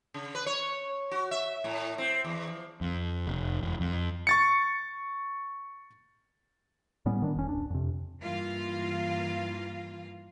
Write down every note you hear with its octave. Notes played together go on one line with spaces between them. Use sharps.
C#3
B4
C#5
F#4
E5
A2
C4
E2
F3
F2
F1
E1
F2
C#6 A6 C#7
A2 G3 B3 C#4
D#3 D4
F1 C#4
D1 D4
F2 C3
G2 E3 A#3 F4 F5